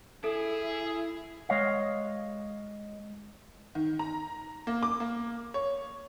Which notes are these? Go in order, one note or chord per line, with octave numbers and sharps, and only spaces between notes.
E4 G#4 A4
G#3 C#5 D#5 F5
D#3
A#5
A#3
D6
A#3
C#5